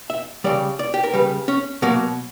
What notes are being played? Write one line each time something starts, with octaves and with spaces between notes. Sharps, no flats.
E5
C#3 G3 D5
D5
G4
A#4
C#3 G3 B4
C#4
B2 F#3 A#3